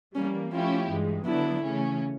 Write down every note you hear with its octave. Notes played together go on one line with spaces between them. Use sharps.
E3 G3 A#3 C#4
F3 A3 C#4 E4 F4 G4
G2 E3 G#3
D3 F#3 B3 D4 E4
C#3 E3 A3 C#4